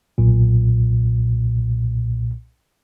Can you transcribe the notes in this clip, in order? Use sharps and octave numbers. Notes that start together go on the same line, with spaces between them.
B1 A#2